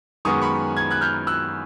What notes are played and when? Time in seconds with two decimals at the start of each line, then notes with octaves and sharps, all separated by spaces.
0.25 F#2 D#3 G#3 B3 C#6 D#6
0.42 B5 C#6
0.77 G#6
0.91 F#6 G#6
1.01 F6 G6
1.27 E6 F#6